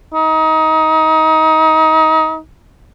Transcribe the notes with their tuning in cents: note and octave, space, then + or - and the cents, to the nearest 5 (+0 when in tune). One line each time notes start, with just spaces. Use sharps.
D#4 +25